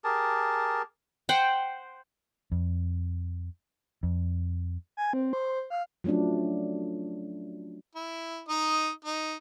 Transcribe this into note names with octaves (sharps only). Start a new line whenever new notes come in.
G4 G#4 A#4 A5
C5 F#5 G5
F2
F2
G#5
C4
C5
F5
F3 F#3 A3 C#4 D4
E4
D#4 D#5
D#4